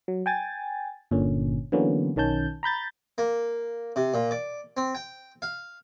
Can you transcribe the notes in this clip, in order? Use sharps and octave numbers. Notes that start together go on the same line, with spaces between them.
F#3
G5 G#5 A6
G1 A#2 D3 C#4
D3 E3 F#3 A#3 B3 C#4
B1 D#3 C#4 A5 G6
A#5 B5 G6 A6
A#3
C3
A#2
D5
C4
G5
F5